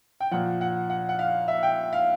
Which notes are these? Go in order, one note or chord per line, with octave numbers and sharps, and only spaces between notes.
G5
A#2 F3 F#5
F#5
F#5
F#5
F5
E5
G5
F5